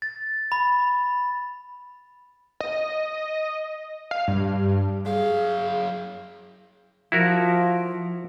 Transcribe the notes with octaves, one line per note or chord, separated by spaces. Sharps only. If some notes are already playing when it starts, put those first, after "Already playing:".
A6
B5
D#5
F5
G2
F#2 G#4 F5
F3 E4 F#4 A#4